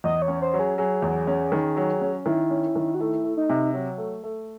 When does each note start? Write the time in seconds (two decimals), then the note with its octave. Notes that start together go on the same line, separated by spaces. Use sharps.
0.04 E2 D#5
0.22 C#5
0.28 C#4
0.42 C5
0.54 F#3
0.59 G#4
0.78 F#3 G#4
1.02 E2
1.27 C#4
1.52 D#3
1.77 F#3
2.01 C#4
2.26 D#3 E4
2.50 C#4
2.76 D#3
2.95 F#4
3.00 A3 E4
3.24 A3
3.37 D#4
3.49 C3
3.74 F#3
3.98 A3
4.24 A3